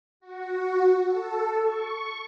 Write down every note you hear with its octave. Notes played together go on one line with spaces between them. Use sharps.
F#4
A4
C#6